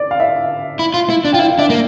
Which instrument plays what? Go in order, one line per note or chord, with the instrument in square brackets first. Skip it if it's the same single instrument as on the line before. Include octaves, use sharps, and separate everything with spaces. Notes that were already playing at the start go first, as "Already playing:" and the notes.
Already playing: [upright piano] D5
F5
E5
[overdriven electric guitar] E4
F4
E4
D4
[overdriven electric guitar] F4 [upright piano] G5
[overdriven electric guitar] E4 [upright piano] F5
[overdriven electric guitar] D4 [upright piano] E5
[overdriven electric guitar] A#3